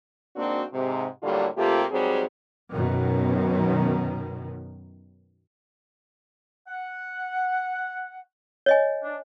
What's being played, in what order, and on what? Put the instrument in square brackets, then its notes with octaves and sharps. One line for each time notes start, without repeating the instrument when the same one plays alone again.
[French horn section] G#2 A#3 C4 D4 F#4
G#2 C3
A2 D3 F#3 G3 A#3 F4
C3 A3 A#3 F4 G4
G#2 F#3 G3 C4 G#4
[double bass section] F#2 B2 D#3
[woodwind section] F#5
[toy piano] C#5 D#5 G#5
[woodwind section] D4